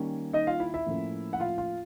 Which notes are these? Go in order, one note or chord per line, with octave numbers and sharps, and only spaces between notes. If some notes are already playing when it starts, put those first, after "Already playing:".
Already playing: D#3 G3 A#3 C#4
D#4 D#5
F4 F5
E4 E5
E4 E5
A2 F3 A#3 C#4
F#5
F4 F5
F4 F5